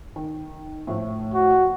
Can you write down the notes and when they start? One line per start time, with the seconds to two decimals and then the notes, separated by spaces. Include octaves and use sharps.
0.16 D#3
0.87 A2 F3 A3
1.34 F#4